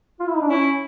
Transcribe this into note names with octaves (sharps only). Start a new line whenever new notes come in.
F4
E4
D#4
D4
C#4 E4